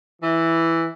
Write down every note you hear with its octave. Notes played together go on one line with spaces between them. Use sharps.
E3